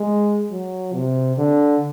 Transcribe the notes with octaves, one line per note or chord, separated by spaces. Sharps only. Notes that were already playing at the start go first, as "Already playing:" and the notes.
Already playing: G#3
F#3
C3
D3